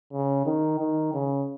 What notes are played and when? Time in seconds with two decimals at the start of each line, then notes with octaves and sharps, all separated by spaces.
0.12 C#3
0.46 D#3
0.79 D#3
1.13 C#3